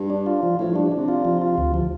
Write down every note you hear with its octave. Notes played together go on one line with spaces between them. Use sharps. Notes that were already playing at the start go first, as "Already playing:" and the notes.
Already playing: G2
D4
F4
F3
A2 F3
G2
D4
A2
C3 D4
F4
F3
F4
D2
F3